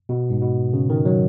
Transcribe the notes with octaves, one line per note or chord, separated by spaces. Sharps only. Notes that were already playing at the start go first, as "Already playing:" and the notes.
B2
G#2
B2
C#3
D#3
F#3